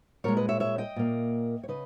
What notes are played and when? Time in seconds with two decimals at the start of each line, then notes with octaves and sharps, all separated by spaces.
0.24 A#2 G#3 A#4 C#5
0.37 B4 D#5
0.49 C#5 E5
0.60 C#5 E5
0.78 D#5 G5
0.96 A#2 A#3
1.63 C#5
1.68 C#3 B4 D#5